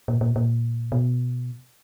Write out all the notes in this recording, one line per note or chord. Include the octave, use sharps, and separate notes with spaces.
A#2
A#2
A#2
B2